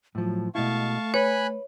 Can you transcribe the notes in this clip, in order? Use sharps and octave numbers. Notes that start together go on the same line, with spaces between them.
A2 F3 F#3
B2 G#3 A3 E4 F5 A5 C#6
B4 C#5 G#5 B5 F#6